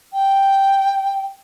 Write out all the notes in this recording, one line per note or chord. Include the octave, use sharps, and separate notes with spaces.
G5